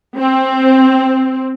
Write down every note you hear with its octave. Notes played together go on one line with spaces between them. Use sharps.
C4